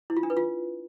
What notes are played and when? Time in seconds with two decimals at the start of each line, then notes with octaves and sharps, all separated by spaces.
0.10 E4
0.17 F4
0.23 D4
0.30 B4
0.37 F4